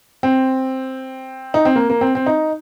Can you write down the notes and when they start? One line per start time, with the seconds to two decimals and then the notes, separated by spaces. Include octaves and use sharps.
0.23 C4
1.54 D#4
1.65 C4
1.76 A#3
1.90 A#3
2.01 C4
2.15 C4
2.26 D#4